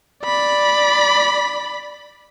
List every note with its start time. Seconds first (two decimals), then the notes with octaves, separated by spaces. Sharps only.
0.23 D5 B5